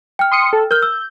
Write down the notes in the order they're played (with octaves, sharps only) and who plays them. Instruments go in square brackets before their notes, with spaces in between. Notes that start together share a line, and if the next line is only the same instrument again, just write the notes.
[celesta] G5 F6
[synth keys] C6 D#6 C#7
A4
[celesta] A#4 F6 [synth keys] G6
[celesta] E6